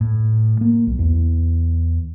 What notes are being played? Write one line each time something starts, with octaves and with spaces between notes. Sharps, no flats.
A2
A#3
B1
E2